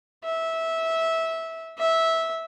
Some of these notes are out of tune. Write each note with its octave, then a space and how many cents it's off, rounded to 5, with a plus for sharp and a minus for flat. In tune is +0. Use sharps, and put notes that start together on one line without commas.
E5 -15
E5 -15